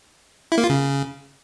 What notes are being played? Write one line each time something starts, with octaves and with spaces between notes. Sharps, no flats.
E4
A#3
F4
C#3